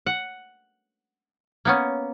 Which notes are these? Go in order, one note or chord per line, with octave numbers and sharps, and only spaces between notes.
F#5
A#3 B3 C#4